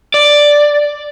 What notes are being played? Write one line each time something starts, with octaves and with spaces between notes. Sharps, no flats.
D5